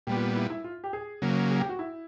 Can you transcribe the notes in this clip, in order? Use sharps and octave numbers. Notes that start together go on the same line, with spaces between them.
A#2 G3 B3 G4
F4
E4
E4
F4
G4
G#4
C#3 F#3 A#3
G#4
G4
F#4
E4